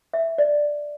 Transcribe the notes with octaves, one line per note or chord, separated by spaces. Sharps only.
E5
D5